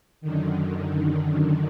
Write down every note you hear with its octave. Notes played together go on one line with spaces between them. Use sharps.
F#2 D3 D#3